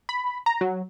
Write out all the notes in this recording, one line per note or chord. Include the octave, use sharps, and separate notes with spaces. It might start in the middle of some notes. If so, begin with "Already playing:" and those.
B5
A#5
F#3